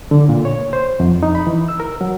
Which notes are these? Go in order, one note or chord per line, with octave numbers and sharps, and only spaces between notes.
D3
A#2
C#5
C5
F2
D#4
B5
E3
E6
A#4
F#3